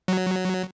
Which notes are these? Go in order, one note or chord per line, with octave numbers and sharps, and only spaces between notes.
F#3